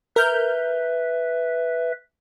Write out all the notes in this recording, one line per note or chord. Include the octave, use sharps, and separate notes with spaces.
A#4 B4 E5 F6 G6